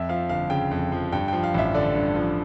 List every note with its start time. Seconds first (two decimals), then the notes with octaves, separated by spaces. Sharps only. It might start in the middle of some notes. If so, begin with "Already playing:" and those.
Already playing: F2 E5
0.09 F3 F5
0.29 G1 F5
0.50 C#3 G5
0.71 F2
0.92 F3
1.12 G2 G5
1.28 F3 G5
1.44 F5
1.54 A1 E5
1.74 D3 D5
1.95 G2
2.15 F3